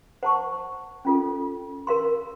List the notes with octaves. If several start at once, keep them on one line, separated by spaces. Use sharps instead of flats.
C5 F#5 A5 C#6
C#4 F4 A4
A#4 F5 C6